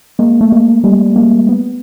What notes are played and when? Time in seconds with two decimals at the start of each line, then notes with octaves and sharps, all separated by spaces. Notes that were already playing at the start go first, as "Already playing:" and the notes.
0.19 G#3 A#3
0.41 A3
0.52 G#3 A#3
0.84 G3 A3
1.16 G#3 A#3
1.49 B3